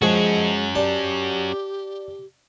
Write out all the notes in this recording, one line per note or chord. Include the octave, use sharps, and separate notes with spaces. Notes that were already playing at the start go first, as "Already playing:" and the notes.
F3 G#3 C#4 F#4 G#4 D#5
G4 D5 A5